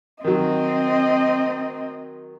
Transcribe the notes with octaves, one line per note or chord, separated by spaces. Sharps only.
D#3 F#3 C4 D#5